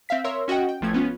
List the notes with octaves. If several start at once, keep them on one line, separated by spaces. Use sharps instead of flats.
C4 E5 F5 B6
A#4 C#5 E5 C6 E6
C#4 F#4 D#5 F#5 G5
G5
A1 F3 A3 G#6
B3 C#4 F4